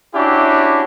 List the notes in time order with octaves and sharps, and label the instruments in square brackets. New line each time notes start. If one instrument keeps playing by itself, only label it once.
[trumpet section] C#4 D4 E4 F#4 G4